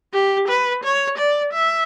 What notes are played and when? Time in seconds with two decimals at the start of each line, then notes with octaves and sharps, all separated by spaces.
0.13 G4
0.48 B4
0.84 C#5
1.18 D5
1.53 E5